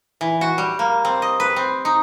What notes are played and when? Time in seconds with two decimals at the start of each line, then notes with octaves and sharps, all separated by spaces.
0.21 E3
0.41 F#4
0.58 G3
0.79 A#3
1.05 C4
1.22 D#5
1.40 B4
1.56 C4
1.85 D#4